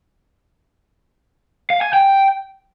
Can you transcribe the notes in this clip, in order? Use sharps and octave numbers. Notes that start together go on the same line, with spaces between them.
F5
G#5
G5